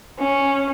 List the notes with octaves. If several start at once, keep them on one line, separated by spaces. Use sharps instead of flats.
C#4